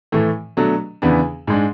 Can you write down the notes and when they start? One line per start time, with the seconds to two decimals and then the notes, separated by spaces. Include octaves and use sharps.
0.12 A2 E3 A3
0.57 B2 F#3 A3 D4
1.02 E2 C#3 E3 B3 D4
1.47 G#2 G#3 D4